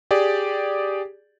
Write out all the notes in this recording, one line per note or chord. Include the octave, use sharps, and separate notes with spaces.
G4 G#4 D5